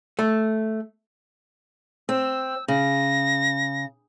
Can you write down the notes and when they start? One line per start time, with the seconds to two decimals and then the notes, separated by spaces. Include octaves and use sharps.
0.19 A3
2.09 C4 E6
2.68 C#3 A#6